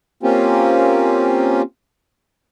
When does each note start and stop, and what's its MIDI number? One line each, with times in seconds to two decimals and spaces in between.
0.23 1.62 58
0.23 1.62 60
0.23 1.62 61
0.23 1.62 65
0.23 1.62 67